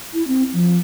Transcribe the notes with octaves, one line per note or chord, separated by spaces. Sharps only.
E4
C4
F3